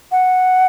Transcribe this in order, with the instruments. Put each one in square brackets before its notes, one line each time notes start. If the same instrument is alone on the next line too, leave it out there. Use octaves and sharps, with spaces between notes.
[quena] F#5